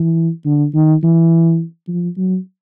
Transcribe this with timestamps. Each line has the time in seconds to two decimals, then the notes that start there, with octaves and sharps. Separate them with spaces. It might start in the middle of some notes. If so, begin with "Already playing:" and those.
Already playing: E3
0.45 D3
0.75 D#3
1.03 E3
1.88 F3
2.17 F#3